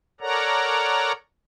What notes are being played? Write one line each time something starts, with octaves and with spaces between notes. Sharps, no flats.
A4 A#4 C#5 D5 F#5 A#5